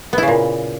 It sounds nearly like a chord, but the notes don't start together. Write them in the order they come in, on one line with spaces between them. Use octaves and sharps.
B3 E4 C#3 A#2